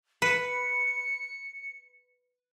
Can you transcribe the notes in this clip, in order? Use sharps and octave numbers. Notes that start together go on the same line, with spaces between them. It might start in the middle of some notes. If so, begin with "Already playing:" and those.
B4 C#7